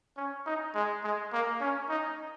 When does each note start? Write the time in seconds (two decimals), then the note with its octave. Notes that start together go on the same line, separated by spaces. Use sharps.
0.17 C#4
0.46 D#4
0.75 G#3
1.04 G#3
1.32 A#3
1.61 C#4
1.89 D#4